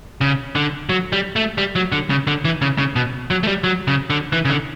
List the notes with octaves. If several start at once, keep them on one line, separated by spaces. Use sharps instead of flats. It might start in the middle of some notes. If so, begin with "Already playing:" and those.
C#3
D3
F#3
G3
A3
G3
F#3
D3
C#3
D3
E3
C#3
C#3
B2
F#3
A3
G3
F#3
C#3
D3
E3
C#3
D3